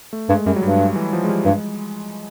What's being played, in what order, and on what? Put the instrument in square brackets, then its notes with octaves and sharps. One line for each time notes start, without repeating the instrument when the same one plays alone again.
[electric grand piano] A3
[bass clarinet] G2 [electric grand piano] G#3
[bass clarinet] F#2 [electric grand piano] G3
[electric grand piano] F#3
[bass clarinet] G2 [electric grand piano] G3
[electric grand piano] E3
F3
G#3
G3
[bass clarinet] G2 [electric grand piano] G#3